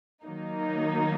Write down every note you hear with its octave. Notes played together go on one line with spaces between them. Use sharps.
D#3 F#3 A#3 D#4